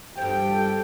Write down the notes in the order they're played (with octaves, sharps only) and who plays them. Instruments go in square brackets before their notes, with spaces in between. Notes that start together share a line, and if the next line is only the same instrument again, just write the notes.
[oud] G2 F3 [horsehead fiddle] G4 A4 [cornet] G5